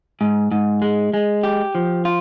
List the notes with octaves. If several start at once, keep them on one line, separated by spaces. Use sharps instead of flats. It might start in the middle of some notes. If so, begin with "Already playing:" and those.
G#2
G#2
G#3
G#3
G4
F3
F4